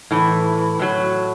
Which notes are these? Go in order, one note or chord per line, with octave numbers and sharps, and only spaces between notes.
A2 E3
A2 F#3